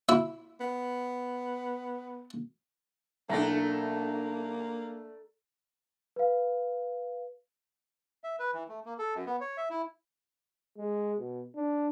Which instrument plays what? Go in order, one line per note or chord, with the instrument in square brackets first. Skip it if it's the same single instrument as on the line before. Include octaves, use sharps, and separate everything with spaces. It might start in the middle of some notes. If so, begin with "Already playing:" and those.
[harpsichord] E4 E5
[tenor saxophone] B3
[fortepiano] B1 E4 [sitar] A3 D4 [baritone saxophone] A#3 [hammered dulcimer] A4 A#5
[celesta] B4 F5
[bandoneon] E5
B4
E3
A3
A#3
A4
F#2
B3
C#5
E5
E4
[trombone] G#3
B2
D4